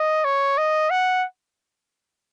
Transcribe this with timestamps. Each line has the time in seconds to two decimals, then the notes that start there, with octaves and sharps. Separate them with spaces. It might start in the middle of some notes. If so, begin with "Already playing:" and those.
Already playing: D#5
0.24 C#5
0.58 D#5
0.91 F#5